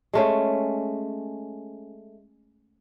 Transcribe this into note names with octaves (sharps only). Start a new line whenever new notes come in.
G#3 A3 C#4